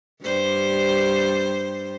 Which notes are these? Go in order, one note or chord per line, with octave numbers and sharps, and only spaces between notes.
G2 G3 C5